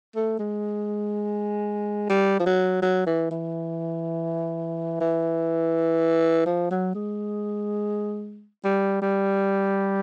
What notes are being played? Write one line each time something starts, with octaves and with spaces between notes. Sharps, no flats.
A3
G#3
G3
F3
F#3
F#3
E3
E3
E3
F3
F#3
G#3
G3
G3